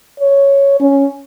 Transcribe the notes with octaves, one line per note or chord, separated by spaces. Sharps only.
C#5
C#4